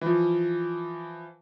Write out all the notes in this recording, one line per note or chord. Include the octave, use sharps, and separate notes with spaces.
E3 F3